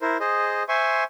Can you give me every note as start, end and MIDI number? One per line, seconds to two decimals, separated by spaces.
0.01 0.17 64
0.01 0.17 70
0.01 0.17 72
0.20 0.63 68
0.20 0.63 72
0.20 0.63 75
0.69 1.04 72
0.69 1.04 76
0.69 1.04 80
0.69 1.04 84
0.69 1.04 85